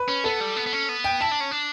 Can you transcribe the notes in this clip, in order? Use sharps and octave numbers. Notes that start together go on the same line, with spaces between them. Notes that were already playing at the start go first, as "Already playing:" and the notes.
Already playing: B4
C#4
B3 A4
G3
B3
B3
C#4
B3
G5
E4 A5
D4
C#4
D4